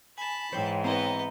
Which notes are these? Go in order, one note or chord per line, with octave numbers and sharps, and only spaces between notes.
G#5 A5 B5
G#2 E3 C5 C#5 E5 G5
B3 C4 E4 D#5 A#5